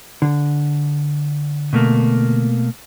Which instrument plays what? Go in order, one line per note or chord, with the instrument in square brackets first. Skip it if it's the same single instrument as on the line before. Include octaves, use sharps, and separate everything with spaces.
[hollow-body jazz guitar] D3
[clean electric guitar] B2 A3 A#3